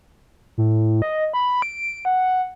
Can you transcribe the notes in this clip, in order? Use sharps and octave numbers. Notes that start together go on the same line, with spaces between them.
A2
D#5
B5
D7
F#5